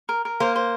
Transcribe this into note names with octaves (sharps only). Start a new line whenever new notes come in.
A#4
A#4
A#3 C5
C5